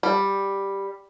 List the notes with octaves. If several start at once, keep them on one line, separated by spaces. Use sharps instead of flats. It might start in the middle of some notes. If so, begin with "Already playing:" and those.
G3